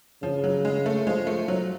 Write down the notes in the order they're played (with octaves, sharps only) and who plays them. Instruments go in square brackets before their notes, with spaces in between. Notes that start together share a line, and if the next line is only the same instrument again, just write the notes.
[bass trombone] C#3 [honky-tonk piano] F3
[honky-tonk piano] F#3
G#3
A3
[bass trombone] F3 [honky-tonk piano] G#3
[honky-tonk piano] A3
F#3